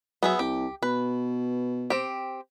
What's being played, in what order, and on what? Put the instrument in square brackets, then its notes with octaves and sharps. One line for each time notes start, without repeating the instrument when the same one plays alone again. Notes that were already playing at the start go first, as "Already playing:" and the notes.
[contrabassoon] F#3 [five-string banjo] B3 G#4 E5
[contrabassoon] C2 [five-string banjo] G4
[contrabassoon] B2 [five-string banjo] B4
[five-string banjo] C4 G4